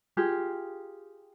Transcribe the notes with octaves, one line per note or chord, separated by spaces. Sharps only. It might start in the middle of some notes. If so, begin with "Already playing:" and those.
F4 G4 G#4